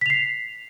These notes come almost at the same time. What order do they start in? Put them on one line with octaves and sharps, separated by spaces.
B6 F7 C7